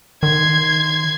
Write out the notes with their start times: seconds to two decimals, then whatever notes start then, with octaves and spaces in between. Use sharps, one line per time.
0.23 D#3 C6 G#6